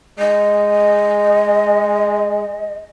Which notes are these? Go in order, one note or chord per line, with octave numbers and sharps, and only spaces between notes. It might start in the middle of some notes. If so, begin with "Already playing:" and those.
G#3 D#5